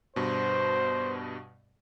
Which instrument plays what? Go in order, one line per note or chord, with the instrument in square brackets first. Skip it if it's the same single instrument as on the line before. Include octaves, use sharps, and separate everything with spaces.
[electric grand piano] G2 B2 [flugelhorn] C5